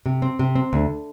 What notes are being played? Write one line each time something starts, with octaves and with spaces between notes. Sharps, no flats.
C3
C4
C3
C4
D2